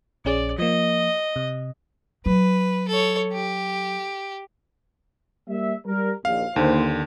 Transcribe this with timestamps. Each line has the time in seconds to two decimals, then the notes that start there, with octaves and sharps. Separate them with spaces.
0.25 A#1 C#4 G#4 D5
0.58 F3 A#3 D#5
1.36 C3
2.26 F#3 B4
2.88 A4 C#5
3.33 G4
5.48 G3 A#3 E5
5.86 G3 A#4
6.25 A#1 D#2 F5
6.56 D#2 D3 A#3 D#4 C5